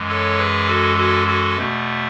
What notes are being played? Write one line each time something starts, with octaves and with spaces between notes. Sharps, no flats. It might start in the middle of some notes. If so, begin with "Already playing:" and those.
Already playing: F#2 E3 G#3
A4 C#5
G#4 B4
F#4 A4
F#4 A4
F#4 A4
E2 B2 A3